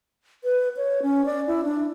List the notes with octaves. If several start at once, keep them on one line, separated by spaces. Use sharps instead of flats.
B4
C#5
C#4
D5
E4
D4